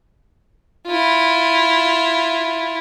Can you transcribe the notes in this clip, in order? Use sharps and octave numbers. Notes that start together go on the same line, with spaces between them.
E4 F4